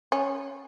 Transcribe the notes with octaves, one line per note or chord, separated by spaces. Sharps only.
C#4